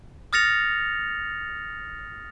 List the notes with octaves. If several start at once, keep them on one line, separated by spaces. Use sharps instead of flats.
D#6 F6 A6 A#6 C#7 F7